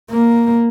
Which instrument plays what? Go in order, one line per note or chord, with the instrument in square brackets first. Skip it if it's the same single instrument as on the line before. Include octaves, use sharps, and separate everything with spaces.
[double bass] A#3